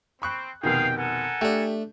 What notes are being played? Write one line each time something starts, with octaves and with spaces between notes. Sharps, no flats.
C4 B5 C#6 F#6
F1 B2 D#3 G#4 F5 G5
A4 A#4 F#5 G#5
A3 D4 G4